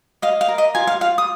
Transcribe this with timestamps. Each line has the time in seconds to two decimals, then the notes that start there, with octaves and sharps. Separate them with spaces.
0.22 D#5 F5
0.41 F5
0.48 A#4
0.58 D#5
0.75 F4 G#5
0.87 F5
1.01 F4 F5
1.18 D#6